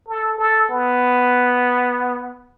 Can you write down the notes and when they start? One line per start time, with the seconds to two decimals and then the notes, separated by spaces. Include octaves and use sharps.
0.08 A4
0.38 A4
0.68 B3